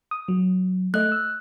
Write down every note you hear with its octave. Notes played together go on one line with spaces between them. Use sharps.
D#6
F#3
A3 D#5 F#6
E6